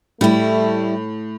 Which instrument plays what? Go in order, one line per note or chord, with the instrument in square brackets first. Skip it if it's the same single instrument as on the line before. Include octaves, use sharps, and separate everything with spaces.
[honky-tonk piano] A2 [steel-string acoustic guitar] G3 E4 [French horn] A3